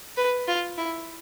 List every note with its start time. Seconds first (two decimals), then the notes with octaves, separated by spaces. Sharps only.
0.17 B4
0.48 F4
0.78 E4